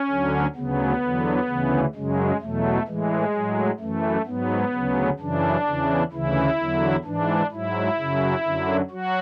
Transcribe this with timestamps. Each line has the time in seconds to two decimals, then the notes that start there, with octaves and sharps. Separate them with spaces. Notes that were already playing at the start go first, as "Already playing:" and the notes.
Already playing: C#4
0.09 D2 D3 F#3
0.56 D2 C#3 F#3 B3
1.02 E2 D3 F#3
1.48 D2 C#3 E3
1.95 F#2 C#3 F#3 G#3
2.41 E2 B2 F#3 A3
2.87 A2 E3 G#3
3.34 A2 F#3
3.80 F#2 E3 A3
4.26 G#2 F#3 B3
4.73 D2 C#3 F#3
5.20 F#2 C#3 E3 D4
5.66 E2 C#3 E3
6.12 D2 C#3 E3 E4
6.58 E2 D3 F#3
7.05 G#2 E3 D4
7.52 G#2 F#3 E4
7.98 F#2 C#3 F#3
8.44 F#2 D3 F#3
8.91 F#3 F#4